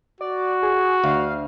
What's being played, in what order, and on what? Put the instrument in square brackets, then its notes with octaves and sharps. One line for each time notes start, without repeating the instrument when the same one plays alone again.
[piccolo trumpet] F#4 [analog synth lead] D5
[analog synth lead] G#4
[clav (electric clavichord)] D2 [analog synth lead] F5